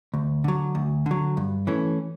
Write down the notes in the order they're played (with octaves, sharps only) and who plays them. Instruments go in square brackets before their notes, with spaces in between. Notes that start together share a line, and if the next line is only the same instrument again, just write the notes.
[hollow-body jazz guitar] D2
D3 F#3
D2
D3 F#3
G2
E3 A3 C#4